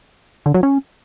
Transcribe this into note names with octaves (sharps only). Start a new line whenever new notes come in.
D3
F#3
C#4